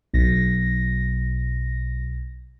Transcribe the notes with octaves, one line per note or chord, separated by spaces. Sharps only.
B1 A#6